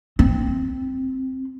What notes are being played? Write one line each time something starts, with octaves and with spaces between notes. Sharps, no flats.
C4